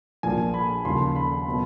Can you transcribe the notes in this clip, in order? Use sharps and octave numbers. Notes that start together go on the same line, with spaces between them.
A#1 A#2 F3 G#5
B5
D#2 C#3 F3 C6
B5
B2 F#3